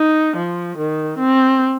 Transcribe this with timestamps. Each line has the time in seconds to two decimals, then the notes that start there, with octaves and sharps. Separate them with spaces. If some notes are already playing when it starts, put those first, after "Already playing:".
Already playing: D#4
0.36 F3
0.77 D#3
1.19 C4